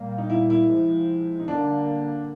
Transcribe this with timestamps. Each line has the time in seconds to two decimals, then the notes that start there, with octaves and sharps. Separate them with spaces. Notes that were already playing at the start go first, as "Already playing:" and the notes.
Already playing: A#2 G3 A#3
0.18 D#4
0.30 E4
0.50 E4
0.69 C3 F3 G#3
1.40 D#4
1.48 D3 G3 A#3 D4